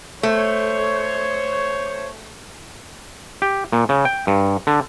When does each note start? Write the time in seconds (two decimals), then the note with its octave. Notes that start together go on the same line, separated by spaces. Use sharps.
0.23 A3 C5 C#5
3.42 G4
3.73 A#2
3.89 C#3
4.05 G5
4.27 G2
4.67 D3